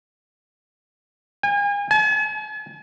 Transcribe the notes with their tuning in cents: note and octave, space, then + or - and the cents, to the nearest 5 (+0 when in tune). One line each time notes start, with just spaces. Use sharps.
G#5 -40
G#5 +45